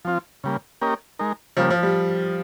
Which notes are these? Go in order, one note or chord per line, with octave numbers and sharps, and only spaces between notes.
F3 C4 F4
C#3 G3 A#3
A#3 C#4 G4 A#4 D#5
G#3 D#4 A#4
C#3 F3 G3 A#3
F3
G3